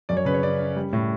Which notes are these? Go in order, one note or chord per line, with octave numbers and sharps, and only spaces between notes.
F#2 D5
C#5
C#3 B4
C#5
C#4 D5
C#4
G3
A2